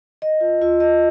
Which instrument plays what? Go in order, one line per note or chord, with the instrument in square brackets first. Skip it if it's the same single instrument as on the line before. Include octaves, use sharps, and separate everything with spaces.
[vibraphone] D#5
F4
F4
D#5